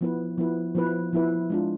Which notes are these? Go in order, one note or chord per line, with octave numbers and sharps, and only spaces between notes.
F3 B3 E4 B4
F3 B3 E4 B4
F3 B3 E4 B4
F3 B3 E4 B4
G#3 D4 F4